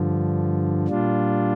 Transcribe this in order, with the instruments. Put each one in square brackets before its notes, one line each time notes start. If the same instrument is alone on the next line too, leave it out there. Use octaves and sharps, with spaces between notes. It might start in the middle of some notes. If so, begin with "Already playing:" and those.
Already playing: [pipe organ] G2 D3 F3
A#2 G3 D4 F4